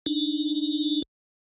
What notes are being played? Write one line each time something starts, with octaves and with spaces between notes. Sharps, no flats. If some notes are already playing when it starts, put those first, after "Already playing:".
D4 D#4